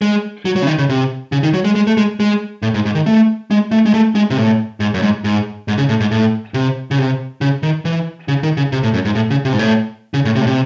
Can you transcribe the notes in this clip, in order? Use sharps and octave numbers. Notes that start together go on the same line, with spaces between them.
G#3
F#3
F#3
C#3
D#3
C#3
C3
C#3
D#3
F#3
G#3
G#3
A3
G#3
G#3
A2
G#2
G#2
D#3
A3
G#3
A3
G#3
A3
G#3
C3
A2
G#2
F#2
G#2
G#2
G#2
C#3
A2
G#2
A2
C3
C#3
C3
C#3
D#3
E3
C#3
D#3
C#3
C3
A2
F#2
G#2
A2
C#3
C3
G#2
A2
C#3
A2
C3
A2
C3